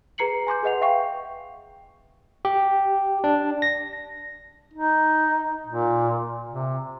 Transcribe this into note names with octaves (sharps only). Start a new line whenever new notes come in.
G#4 B4 A#5 C7 C#7 F#7
G#5 C6 D6 G6
G#4 B4 D#5 F#5 F7
E5 F5 G5 C#6 C7
G4
D4
A#6
D#4
A#2
C3